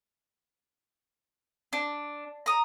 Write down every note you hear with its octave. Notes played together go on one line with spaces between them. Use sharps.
D4
A#5 D#6